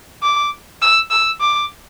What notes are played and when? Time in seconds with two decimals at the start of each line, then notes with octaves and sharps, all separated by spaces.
0.23 D6
0.82 E6
1.11 E6
1.41 D6